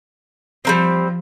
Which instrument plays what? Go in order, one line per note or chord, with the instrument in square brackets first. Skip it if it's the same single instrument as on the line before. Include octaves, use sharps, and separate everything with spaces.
[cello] F3 [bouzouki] G3 A#3 C4